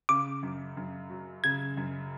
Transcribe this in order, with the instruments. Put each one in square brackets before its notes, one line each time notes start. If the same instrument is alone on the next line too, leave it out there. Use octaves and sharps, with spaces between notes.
[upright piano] C#3 [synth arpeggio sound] D6
[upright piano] F#2
F#2
F#3
[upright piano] C#3 [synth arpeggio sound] G#6
[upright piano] F#2